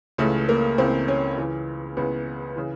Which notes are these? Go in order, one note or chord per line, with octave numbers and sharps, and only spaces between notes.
C#2 C#3 E3 A3
A#3
C#2 C#3 E3 C4
C#4
C#2 C#3 E3
C#2 C#3 E3 B3
C#3 E3